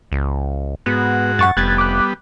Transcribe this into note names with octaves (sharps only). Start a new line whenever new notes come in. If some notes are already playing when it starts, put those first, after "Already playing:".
C#2
G#2 B3 F#4
F#2 F#5 C#6 A6
F1 G3 B3 F#6 G#6 A6
D6 F#6